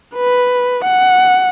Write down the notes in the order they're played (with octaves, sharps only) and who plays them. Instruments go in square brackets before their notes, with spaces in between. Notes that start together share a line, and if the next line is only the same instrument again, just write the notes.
[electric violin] B4
F#5